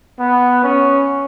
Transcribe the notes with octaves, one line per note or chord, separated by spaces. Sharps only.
B3
C#4